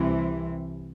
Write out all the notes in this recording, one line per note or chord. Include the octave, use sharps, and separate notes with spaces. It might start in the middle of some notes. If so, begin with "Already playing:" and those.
Already playing: C2 C3 E3